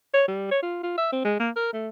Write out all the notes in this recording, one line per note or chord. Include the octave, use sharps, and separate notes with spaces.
C#5
G3
C#5
F4
F4
E5
C4
G#3
A#3
A#4
A3